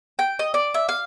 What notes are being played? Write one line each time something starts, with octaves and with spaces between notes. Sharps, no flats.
G5
D#5
D5
E5
F5